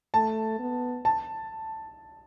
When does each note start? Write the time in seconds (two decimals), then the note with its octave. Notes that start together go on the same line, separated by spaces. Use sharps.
0.14 A3 A5
0.59 B3
1.05 A5